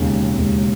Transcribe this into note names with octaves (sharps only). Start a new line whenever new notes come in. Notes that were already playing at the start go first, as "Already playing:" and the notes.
Already playing: E1 D#2 C#3
E1 D#2 C#3